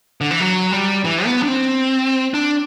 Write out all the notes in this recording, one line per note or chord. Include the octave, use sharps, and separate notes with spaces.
D3
E3
F#3
G3
E3
B3
D4
C4
D4